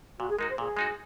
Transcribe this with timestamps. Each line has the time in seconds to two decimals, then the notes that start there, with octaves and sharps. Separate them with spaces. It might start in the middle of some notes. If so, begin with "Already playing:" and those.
0.20 A#2 F#4
0.29 G#4
0.39 G#3 D#4 F#4 A#4
0.49 C5
0.58 A#2 G#4
0.77 G#3 D#4 F#4